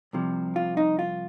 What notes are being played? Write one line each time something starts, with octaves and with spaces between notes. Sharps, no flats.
C2 C3 F3
F4
D#4
F4